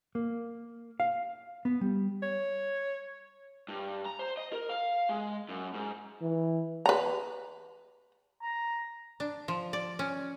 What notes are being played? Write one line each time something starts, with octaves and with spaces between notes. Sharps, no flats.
A#3
F5
B3
G3
C#5
G2
A#5
C5
D#5
A#4
F5
G#3
F#2
G#2
E3
B4 A#5
A#5
D4
F3
D5
C#4